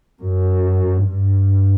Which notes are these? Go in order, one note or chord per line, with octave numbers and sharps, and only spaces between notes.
F#2
G2